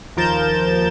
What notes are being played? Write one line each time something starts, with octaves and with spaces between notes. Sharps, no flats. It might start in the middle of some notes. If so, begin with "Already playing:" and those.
D#2 F3 A#4 G6 A6 E7